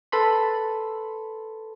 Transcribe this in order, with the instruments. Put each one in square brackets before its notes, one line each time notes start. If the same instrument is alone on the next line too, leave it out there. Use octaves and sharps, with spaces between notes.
[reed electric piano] A4 B4 B5 C6